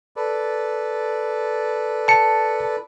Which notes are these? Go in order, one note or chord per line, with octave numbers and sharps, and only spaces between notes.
A4 B4 D5
A5 C#7